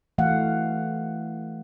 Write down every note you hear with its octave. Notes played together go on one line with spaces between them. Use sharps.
E3 A3 F5 F#5